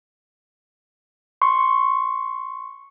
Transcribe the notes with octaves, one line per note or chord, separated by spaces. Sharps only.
C6 C#6